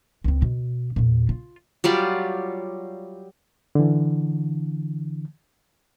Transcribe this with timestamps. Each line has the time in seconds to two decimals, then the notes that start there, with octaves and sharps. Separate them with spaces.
0.24 C#2 C4
0.42 B2
0.96 E2 A#2
1.29 F4
1.84 F#3 G3 F4 D5
3.75 D3 E3